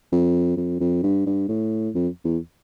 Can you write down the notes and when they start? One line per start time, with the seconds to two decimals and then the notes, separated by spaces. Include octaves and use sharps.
0.12 F2
0.57 F2
0.80 F2
1.03 G2
1.26 G2
1.49 A2
1.95 F2
2.25 E2